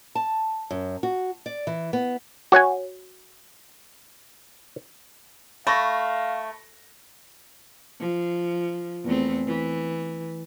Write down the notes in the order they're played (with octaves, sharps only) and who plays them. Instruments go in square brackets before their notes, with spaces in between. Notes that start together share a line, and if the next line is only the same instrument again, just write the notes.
[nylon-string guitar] A5
F#2
F#4
D5
E3
B3
[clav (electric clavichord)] F#4 C#5 F#5 G#5
[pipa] A3 [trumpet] F5 [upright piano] B5 C#6 A#6
[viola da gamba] F3
E2 A3 C4
E3